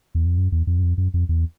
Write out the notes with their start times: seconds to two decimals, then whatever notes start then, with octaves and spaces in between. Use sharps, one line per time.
0.15 E2
0.26 F2
0.38 F#2
0.52 E2
0.67 F2
0.79 F#2
0.83 F2
0.97 F#2
1.14 F2
1.29 E2